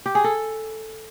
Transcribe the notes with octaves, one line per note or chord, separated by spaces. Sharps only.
G4
G#4
A4